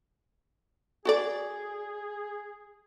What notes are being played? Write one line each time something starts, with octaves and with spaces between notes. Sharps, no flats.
F#4 G#4 A4 D5